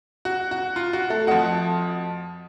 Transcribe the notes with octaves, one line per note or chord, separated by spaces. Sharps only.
F#4
F#4
F4
F#4
A3 A4
F2 F3 F#4 F#5